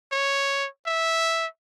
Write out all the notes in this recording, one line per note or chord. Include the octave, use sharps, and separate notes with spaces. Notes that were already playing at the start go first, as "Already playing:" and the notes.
C#5
E5